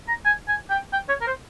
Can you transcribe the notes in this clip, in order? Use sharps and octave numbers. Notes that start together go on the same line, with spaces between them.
A#5
G#5
G#5
G5
G5
C#5
A#4
C5